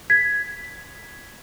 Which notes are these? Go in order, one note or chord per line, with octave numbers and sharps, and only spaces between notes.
G#6 B6